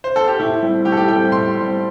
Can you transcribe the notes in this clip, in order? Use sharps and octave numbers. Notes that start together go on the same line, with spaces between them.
C5
A4
G4
A2 E4
G3 C4
A2 G4
A4
G4
G3 C4 G5
A2 C6
G3 C4